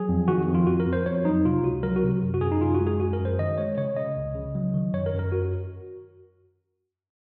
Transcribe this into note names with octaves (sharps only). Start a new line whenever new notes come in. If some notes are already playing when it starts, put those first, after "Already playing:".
Already playing: F#3 G#4
F2
D#3 F#4
F2
F4
F2 F#4
A#4
F2
C5
F2 C#5
F#3 D#4
C3 F4
C#2 F#4
F#3 A#4
F#4
C3
F#2
F#4
F#2 G#4
D#4
F#2 F4
F#4
G#3
G#4
F#2 F#4
A#4
F#2
C5
D#3 D#5
G#3 C#5
C#3 C#5
C#3 D#5
C#2
C#3
F#3
D#3
F#2 C#5
A#4
F#2
A#4
F#4